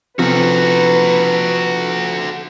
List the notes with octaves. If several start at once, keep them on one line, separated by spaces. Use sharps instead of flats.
C3 F3 F#4 A4 B4